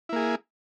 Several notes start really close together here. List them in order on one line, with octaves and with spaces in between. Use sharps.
E4 A#3 G#4